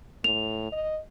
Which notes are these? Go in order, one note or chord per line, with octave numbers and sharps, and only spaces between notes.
A2 F7
D#5